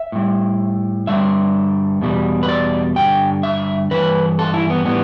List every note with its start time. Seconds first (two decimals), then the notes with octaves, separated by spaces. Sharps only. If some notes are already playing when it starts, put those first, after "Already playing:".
Already playing: E5
0.12 A2 G3
1.07 G2 D3 G3 E5
2.02 E2 B2 G3
2.43 B4
2.48 D5
2.96 G2 D3 G3 G5
3.43 E5
3.91 G2 E3 B4
4.39 A4
4.54 E4
4.70 B3
4.85 A2 E3 G3 B3